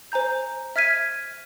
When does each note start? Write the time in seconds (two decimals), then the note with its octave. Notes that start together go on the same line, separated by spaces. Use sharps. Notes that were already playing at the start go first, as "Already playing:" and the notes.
0.12 C5 G#5 A#5 G6
0.76 E5 F6 G#6 B6 D#7